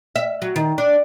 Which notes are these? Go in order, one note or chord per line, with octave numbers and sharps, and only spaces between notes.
E5
F#3
D#3
D4